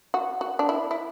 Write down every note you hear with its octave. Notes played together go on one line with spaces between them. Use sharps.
F#4
F#4
D4
E4
E4